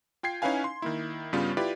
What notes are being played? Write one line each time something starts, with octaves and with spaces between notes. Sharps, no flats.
F4 G5 G#6 C7
C#4 D#4 E4 B4 F5 G#5
C6
D#3 A#3 E4
G2 C#3 G3 B3 C#4 F4
E4 F4 G4 B4 D5